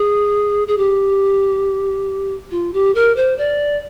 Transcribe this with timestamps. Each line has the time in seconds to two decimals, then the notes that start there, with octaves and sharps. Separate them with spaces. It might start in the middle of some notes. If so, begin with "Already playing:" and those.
Already playing: G#4
0.68 G#4
0.77 G4
2.51 F4
2.74 G4
2.95 A#4
3.16 C5
3.38 D5